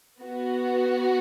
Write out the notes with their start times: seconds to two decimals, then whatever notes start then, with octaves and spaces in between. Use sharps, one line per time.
0.20 B3 F#4